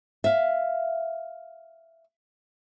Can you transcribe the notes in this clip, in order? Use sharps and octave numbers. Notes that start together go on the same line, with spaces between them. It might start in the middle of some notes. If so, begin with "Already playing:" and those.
E5 F5